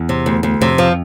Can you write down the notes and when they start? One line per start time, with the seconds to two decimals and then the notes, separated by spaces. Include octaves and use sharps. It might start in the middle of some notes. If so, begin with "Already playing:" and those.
Already playing: E2
0.09 C3
0.26 D2
0.43 D2
0.61 F2 C3
0.78 F3